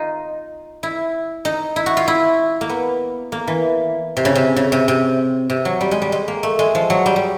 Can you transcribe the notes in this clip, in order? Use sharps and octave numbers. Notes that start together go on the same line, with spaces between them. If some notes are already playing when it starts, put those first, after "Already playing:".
Already playing: D#4 F4
E4
D#4
E4
F#4
F4
E4
A#3
B3
A#3
E3
C3
C#3
C3
C#3
C3
C3
C3
F#3
G3
G#3
G3
G#3
A#3
A3
G#3
F3
F#3
G3
G3